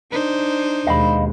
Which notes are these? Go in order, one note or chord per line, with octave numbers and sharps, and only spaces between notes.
D4 D#4 C5
D#2 B2 G#3 D#5 F5 B5